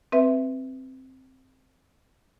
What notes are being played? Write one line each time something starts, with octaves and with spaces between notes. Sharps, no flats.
C4 B4 E5